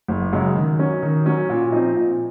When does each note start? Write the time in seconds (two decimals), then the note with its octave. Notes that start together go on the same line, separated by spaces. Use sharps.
0.08 F#1
0.33 F#2 C#3 G#3
0.56 D#3
0.79 F#3 C#4
1.03 D#3
1.26 F#3 C#4
1.49 A#2
1.72 F3 C4 D#4
1.96 A#2